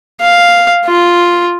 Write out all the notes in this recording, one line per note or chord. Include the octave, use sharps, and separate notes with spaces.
F5
F4